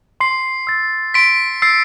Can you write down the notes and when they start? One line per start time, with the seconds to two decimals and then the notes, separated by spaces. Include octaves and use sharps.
0.20 C6 C7
0.67 E6 A6
1.14 C6 B6 D7
1.62 E6 A6 C7